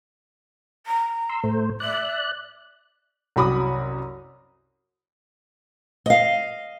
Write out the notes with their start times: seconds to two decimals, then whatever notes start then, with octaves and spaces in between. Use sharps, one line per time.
0.86 A#5
1.29 C6 E6
1.44 A2 A3 C5
1.80 D5 E5 F#6
3.36 C2 F#2 F#4 B5 D6 D#6
6.06 D#5 F5